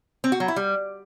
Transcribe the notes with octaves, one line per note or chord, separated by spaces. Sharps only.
C4
F#4
F#3
E4
G3